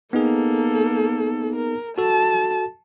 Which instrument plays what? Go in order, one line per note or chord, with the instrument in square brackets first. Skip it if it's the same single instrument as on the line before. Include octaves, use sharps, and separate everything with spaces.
[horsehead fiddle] A#3 A4 [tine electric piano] B3 D#4 G#4
[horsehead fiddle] A#4
[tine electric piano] F#4 A4 [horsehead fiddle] A5